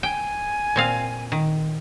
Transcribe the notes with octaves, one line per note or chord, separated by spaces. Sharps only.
G5 G#5
A#2 C4 F5
D#3